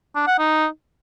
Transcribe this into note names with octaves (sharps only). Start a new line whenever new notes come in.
D4
F#5
D#4